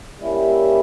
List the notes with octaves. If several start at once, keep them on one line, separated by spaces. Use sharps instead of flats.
G3 A#3 C#4 E4